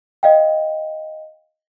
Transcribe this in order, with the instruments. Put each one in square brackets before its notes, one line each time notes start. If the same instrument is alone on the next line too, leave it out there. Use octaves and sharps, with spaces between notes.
[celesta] D#5 F5 G5